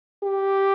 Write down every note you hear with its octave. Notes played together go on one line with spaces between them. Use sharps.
G4